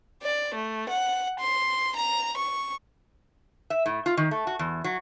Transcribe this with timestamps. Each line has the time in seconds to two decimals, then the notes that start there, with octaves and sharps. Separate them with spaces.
0.24 D5
0.56 A3
0.91 F#5
1.40 C6
1.97 A#5
2.39 C#6
3.70 E5
3.86 A2
4.06 F4
4.17 D#3
4.31 A3
4.47 F#4
4.59 E2
4.84 F#3